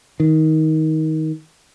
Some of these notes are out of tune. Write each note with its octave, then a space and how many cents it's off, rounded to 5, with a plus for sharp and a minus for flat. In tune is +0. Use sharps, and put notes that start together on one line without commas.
D#3 +20